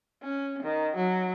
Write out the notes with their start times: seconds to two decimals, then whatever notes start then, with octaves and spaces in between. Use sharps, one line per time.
0.23 C#4
0.63 D#3
0.96 F#3